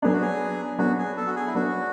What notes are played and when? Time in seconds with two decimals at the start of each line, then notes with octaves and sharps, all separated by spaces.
0.02 F#3 B3 D4 G#4
0.13 F#4
0.22 G#4
0.79 F#3 B3 D4 F#4
0.98 G#4
1.17 A4
1.27 F#4
1.36 G#4
1.47 E4
1.55 F#3 B3 D4 F#4